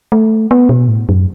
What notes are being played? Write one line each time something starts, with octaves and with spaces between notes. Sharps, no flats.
A3
B3
B2
A2
F#2